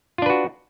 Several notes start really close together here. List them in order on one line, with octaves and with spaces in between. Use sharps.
F4 D4 B4 F#4